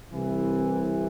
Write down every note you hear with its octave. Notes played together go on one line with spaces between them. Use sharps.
C2 C3 E3